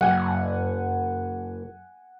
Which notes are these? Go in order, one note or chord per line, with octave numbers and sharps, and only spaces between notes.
F#1 F#2 F#5 G#5